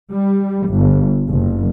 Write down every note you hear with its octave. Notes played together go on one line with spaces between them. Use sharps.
G3
G1
F#1